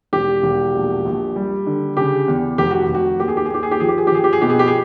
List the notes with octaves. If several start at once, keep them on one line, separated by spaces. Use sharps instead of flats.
E1 G4
E1
A#1
A#1
G3
D3
C#3 G4
E2
F1 G4
F#4
F1
F#4
D#2 G4
G#4
G4
G#4
D#2 G4
G#4
G4
F3 G#4
G4
G#4
G4
F3 G#4
G4
G#4
B2 G4
G#4
G4
G#4